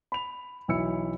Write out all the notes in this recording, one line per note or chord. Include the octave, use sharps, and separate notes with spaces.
B5 F7
B1 E3 E4 E6 C#7